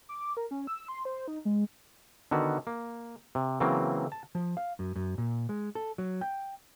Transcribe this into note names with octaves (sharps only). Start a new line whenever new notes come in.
D6
A#4
C#4
E6
C6
C5
D#4
G#3
D3 D#3 B3 F#4
A#3
C3
C#3 E3 F#3 A#3 C4
A5
F3
F5
F#2
F#2
A#2
G#3
A4
F#3
G5